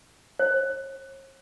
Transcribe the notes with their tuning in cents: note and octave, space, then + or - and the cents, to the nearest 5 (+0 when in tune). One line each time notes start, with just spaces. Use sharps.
C#5 -45